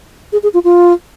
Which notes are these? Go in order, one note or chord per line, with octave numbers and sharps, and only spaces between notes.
G#4
G#4
F4
F4